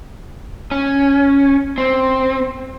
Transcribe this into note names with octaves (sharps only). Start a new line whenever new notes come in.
C#4
C4